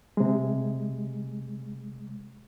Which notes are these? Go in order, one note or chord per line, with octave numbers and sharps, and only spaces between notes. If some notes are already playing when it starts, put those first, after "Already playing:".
C3 G#3